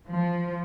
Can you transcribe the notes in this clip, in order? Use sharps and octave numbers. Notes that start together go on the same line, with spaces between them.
F3